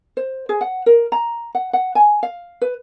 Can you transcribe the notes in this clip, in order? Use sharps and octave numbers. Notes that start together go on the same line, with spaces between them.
C5
G#4
F#5
A#4
A#5
F#5
F#5
G#5
F5
B4